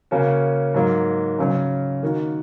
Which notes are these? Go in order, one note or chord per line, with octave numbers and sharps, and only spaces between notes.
C#3 A#3 C#4 F#4
G#2 F#3 A#3
C#3 F#3 C#4
D#3 A#3 F#4